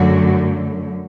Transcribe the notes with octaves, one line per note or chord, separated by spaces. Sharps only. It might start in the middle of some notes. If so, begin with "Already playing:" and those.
Already playing: F#2 D3 F#3 A3 F#4